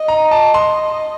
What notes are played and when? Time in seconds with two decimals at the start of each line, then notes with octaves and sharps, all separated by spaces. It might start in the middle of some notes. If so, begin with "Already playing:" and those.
Already playing: D#5
0.08 A#5
0.31 A5
0.54 C6